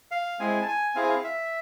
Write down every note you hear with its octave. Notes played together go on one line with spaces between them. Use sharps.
F5
G#3 C4 E4 G#4 G#5
A5
G#5
C4 E4 G#4 F5
G#5
F5
E5